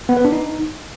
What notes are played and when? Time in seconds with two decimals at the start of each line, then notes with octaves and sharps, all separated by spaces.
0.09 B3
0.17 B4
0.25 D4
0.32 D#4